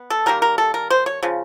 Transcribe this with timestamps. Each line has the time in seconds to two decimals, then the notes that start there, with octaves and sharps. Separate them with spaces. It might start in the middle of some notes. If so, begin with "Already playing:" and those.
Already playing: B3
0.10 A4
0.26 D#3 G3 A#3 A#4
0.42 A#4
0.58 A4
0.74 A#4
0.90 C5
1.06 C#5
1.23 C#3 F3